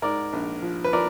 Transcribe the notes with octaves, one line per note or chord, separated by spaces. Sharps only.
G#2 A#4 D5
A#1
F3
B4
F3 A#4 D5